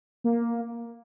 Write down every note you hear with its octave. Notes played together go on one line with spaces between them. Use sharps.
A#3